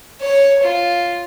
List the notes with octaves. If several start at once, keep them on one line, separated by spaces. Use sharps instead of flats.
C#5
F4